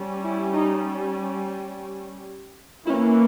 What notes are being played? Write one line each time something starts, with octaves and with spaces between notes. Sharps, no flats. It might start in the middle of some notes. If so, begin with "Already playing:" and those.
Already playing: G3 C#4
E4
D#4
E3 A#3 C#4 E4